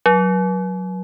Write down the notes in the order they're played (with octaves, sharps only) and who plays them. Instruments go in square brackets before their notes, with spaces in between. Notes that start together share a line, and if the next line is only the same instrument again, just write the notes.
[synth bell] F#3